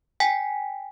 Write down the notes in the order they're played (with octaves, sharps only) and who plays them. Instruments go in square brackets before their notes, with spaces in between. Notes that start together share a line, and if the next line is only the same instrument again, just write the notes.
[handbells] G5 G#5 B6